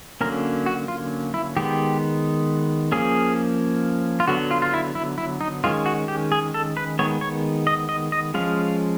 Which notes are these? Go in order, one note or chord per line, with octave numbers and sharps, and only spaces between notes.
D3 F#3 A#3 C#4 A#4
F#4
F4
E4
D#3 G#3 B3 G4
F3 A#3 C#4 G#4
F4
D3 F#3 B3 F#4
F4
F4
E4
E4
E4
D#4
D#3 G#3 C#4 F4
F#4
G4
G#4
A4
B4
D#3 G#3 B3 C#5
C#5
D#5
D#5
D#5
F3 G#3 C#4 F5